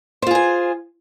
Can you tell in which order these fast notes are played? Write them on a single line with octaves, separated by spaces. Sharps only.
C5 F4 G#4 G#5